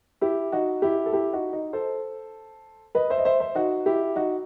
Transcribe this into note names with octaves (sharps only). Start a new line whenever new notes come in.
E4 G4
D#4 F#4
E4 G4
A4
E4 G4
D#4 F#4
D#4
A4 C5
B4 D#5
C5 E5
D#5
C5 E5
C5 E5
D#4 F#4
E4 G4
D#4 F#4